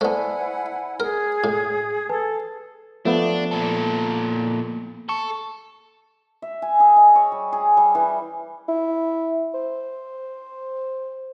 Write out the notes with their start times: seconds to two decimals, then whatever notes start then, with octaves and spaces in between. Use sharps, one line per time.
0.01 A3 B3 E4 C5 D5 F#5 G#5 A5
1.00 G#4 A#4
1.44 A2
2.09 A4 B4 G#5 A5
3.05 F3 A3 B3 D4
3.51 A#2 A4
5.09 A4 C#6
6.42 E5
6.62 G#5
6.80 G#4
6.96 D#5
7.15 C#5
7.32 G3
7.52 G#4
7.77 G3
7.95 E3
8.68 E4
9.54 C5